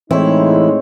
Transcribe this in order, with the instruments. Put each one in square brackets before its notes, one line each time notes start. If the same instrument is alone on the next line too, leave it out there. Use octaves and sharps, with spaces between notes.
[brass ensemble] A2 G#3 D#4 [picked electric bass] E3 [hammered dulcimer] C4 C#5 [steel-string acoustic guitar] E4